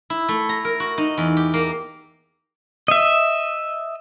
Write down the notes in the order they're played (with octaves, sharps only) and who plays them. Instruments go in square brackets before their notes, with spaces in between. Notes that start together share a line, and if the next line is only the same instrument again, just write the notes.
[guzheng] E4
A3
A#5
A#4
F#4
D#4
E2
G4
A#3
[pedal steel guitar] D#5 E5